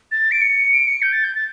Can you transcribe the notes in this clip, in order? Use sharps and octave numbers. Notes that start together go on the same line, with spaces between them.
A6
D7
C#7
D7
C#7
G6
A6
G6
A6